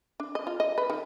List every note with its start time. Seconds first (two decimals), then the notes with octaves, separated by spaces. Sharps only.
0.20 D4
0.35 D#5
0.47 F4
0.60 D#5
0.78 B4
0.90 D#3